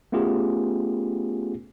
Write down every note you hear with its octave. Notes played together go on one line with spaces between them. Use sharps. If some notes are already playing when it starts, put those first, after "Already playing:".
A3 B3 C#4 F4 G4 G#4